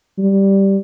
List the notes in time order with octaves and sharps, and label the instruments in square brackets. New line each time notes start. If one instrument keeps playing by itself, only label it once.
[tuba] G3